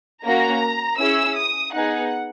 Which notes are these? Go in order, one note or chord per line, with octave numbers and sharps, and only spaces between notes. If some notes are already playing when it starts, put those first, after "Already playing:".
A#3 C#4 F#4 A#5
C#4 E4 G#4 E6
D#6
B3 D#4 G#4 F#5